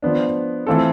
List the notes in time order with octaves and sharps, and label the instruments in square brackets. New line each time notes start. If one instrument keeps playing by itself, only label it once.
[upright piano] F3 B3 D4
E3 A3 C4 F4 A4